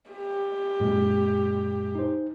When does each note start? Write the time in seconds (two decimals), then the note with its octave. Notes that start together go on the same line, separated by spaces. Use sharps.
0.11 G4
0.80 F#2 A#2 G#3
1.95 D#4 C5